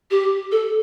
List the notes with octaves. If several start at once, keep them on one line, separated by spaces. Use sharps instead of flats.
G4
A4